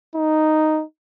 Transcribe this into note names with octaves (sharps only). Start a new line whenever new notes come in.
D#4